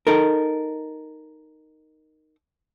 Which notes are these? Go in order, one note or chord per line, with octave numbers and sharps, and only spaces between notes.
D#4 A4 A#4